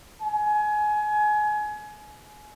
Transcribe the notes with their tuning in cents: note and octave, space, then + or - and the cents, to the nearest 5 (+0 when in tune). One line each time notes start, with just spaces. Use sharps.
G#5 +25